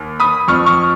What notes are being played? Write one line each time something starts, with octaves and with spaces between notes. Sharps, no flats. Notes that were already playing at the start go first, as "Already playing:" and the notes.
Already playing: D#2
B5 D#6
F2 F3 C#6 F6
C#6 F6